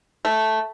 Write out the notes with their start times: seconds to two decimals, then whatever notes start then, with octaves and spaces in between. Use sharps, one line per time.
0.25 A3